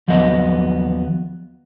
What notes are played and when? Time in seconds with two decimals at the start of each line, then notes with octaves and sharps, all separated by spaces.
0.08 D#2 F3 F#3 B3 D#5